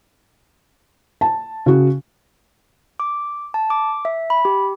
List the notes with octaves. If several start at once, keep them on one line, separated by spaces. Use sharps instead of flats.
A5
C#3 F#4
D6
A5
D6
E5
B5
G4